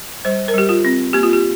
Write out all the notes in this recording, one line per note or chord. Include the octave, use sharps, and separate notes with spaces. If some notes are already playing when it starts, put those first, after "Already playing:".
G3 C5
A#4
G3 G4
F4
C4
A#3 G4
F4
G4